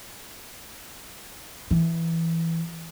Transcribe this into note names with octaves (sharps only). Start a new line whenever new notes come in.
E3